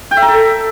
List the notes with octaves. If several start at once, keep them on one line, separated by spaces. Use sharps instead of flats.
G5
E5
A#5
A4